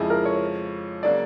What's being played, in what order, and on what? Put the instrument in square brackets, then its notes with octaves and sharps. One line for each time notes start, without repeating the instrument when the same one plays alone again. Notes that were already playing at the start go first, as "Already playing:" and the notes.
Already playing: [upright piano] F2 C#3 F3 G#3 [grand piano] E4 G#4
[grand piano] A#4
C#5
[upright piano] C#3 F#3 A#3 D4 F#4 [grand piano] D5